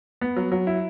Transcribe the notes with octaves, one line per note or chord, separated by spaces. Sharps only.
B3
F#3
F#3
E4